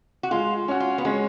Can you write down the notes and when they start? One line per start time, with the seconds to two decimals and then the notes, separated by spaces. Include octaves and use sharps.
0.23 F#4
0.31 G#3 F4
0.68 C#4 F#4
0.80 F4
0.98 B3
1.05 G#3 C#4